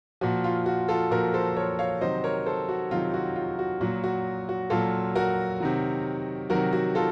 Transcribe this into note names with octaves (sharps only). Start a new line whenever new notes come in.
A#2 F3 F#4
F4
F#4
F4 A4
A#2 F3 F#4 A#4
A4 C5
A#4 C#5
C#5 F5
C3 D#3 F#3 C5 D#5
A#4 C#5
A4 C5
F#4
C3 D#3 F#3 F4
F#4
F4
F#4
A#2 F#3 F#4
F#4
F#4
A#2 F#3 F4 A4
F#4 A#4
C3 D#3 F#3
C3 D#3 F#3 F#4 A#4
F#4
F4 A4